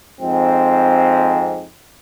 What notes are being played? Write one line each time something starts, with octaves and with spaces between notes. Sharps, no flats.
F2 G#2 C4